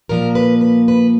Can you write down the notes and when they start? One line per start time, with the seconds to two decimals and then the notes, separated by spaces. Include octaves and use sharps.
0.09 A#2 F3 A#3 A#4
0.35 B4
0.61 B4
0.88 B4